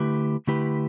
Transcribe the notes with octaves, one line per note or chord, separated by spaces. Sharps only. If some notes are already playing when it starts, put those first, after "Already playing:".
Already playing: D3 A3 E4 G4 B4
D3 A3 E4 G4 B4